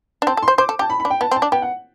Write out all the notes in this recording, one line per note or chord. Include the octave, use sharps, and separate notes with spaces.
D4
C4 A5
A4
C6
C5
C5 D6
A4
G4 A5
B5
B5
D4
G5
B3 A5
C4
A5
D4
B3 G5
F#5